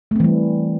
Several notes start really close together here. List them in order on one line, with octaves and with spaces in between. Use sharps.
A3 C4 E3 G3